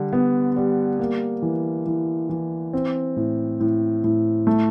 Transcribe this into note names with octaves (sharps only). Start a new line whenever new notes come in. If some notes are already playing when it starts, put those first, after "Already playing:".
Already playing: D3 G3
B3
G3
A#3
E3
E3
E3
C4
A2
A2
A2
A3